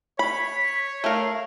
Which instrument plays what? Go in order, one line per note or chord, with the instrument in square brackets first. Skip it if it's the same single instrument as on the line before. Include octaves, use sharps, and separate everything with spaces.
[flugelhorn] C#5 [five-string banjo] B5 [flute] B6
[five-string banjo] A3 A#4 [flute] F5